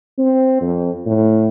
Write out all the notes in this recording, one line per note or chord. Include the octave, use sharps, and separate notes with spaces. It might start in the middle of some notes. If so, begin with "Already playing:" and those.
C4
F2
A2